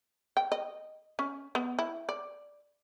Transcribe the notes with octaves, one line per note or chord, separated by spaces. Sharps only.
G5
D#5
C#4
B3
E4
D5